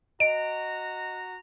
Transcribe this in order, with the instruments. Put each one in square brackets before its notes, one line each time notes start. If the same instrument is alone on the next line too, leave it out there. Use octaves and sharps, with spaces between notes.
[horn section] F#4 A#5 [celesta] D#5 [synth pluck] D7